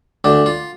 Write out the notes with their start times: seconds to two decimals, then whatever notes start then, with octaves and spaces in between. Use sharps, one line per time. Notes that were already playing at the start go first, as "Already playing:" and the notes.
0.24 D2 D4
0.46 F4